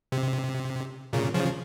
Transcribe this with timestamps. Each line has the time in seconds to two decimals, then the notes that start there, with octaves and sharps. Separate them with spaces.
0.12 C3
1.13 A#2 C#3
1.34 C#3 F3